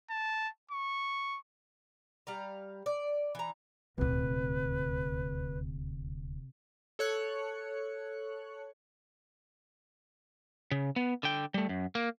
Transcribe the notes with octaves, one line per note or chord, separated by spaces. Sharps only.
A5
C#6
G3 F5 A#5
D5
E3 A#5
D#1 D2 C3 B4
A4 C#5 F#6 C#7
C#3
B3
D3 G5
G3 A3
F#2
A#3